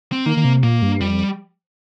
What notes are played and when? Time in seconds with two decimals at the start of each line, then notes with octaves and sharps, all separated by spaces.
0.12 C4
0.26 D#3 A#3
0.37 D#3
0.45 C3
0.63 A#2 A#3
0.82 G2
1.00 F2 G3